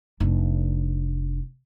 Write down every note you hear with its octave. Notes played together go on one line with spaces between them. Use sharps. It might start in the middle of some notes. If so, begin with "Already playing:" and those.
F1 D4